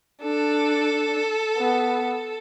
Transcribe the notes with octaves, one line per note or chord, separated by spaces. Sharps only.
D4 A4
B3